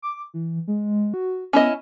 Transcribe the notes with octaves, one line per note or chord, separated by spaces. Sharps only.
D6
E3
G#3
F#4
B3 C#4 E4 D#5